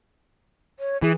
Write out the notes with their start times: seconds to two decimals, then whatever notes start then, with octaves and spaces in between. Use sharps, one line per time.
0.80 C#5
1.02 E3 G#4